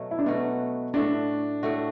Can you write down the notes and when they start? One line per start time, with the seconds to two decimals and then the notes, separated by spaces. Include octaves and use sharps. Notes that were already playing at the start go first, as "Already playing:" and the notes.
Already playing: B2 F#3 A3 F#4
0.11 E4
0.19 D4
0.26 B2 F#3 A3 B3 F#4
0.94 A2 A3 D4 F#4
1.63 A2 A3 F#4